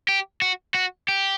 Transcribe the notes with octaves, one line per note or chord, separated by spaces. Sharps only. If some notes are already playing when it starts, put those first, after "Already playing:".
G4
F#4
F#4
G4